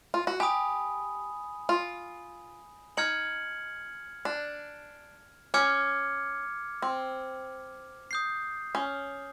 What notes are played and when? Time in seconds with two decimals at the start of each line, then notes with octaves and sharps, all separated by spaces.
0.14 F4
0.27 F#4
0.40 G4 G#5 B5 D#6
1.69 F4
2.97 D#4 F6 G#6 C#7 F#7
4.25 D4
5.54 C#4 D6 F6 G#6 C#7
6.82 C4
8.11 D#6 G6 C7
8.75 C#4